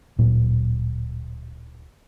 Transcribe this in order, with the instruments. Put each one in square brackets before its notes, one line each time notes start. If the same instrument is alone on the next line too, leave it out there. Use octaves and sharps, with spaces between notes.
[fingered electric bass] D1 A#2 F#3